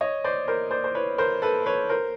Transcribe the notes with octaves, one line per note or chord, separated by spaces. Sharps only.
C#5 D#5
C5 D5
A#4 C5
C5 D5
C5
B4 C#5
A#4 C5
A4 B4
B4 C#5
A#4 C5